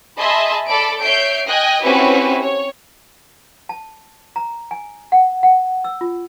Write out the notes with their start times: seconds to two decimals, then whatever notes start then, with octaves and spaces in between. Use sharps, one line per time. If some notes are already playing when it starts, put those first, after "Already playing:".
0.19 G#4 D#5 E5 A5 B5 C6
0.67 A4 D5 B5 D7
1.01 C#5 E5 G6 C7 D7
1.47 D#5 G5 G#5 F#6
1.81 C4 C#4 E4 F#4 G4 B4
2.40 C#5
3.69 A5
4.36 A#5
4.71 G#5
5.12 F#5
5.43 F#5
5.84 E6
6.01 F4